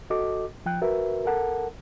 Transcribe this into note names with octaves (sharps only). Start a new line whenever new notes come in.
F#4 A4 D#5 D6
F3 G5 F#6
F#4 A#4 B4 E5
A4 A#4 F#5 A5